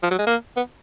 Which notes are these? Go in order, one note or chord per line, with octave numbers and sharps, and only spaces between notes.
F3
F#3
G#3
A#3
B3